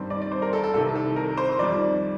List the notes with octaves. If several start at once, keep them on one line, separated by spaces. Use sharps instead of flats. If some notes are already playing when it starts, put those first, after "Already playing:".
Already playing: G2 D#3 G3 C4
D5
D5
C5
A#4
A4
A4
C2 C3 D#3 A4
A4
A#4
C5
F2 D#3 G3 D5